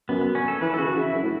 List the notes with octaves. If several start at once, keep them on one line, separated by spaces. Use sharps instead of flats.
F#2 B3
B3
C#4
A4
E3 B4
E3 A4
C#3 F#4
C#3 E4
F#2
A2